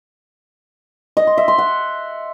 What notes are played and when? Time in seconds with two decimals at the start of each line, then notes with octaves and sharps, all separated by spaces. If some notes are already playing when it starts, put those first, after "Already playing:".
1.17 D#5
1.27 C6
1.38 E5
1.48 C6
1.58 F#5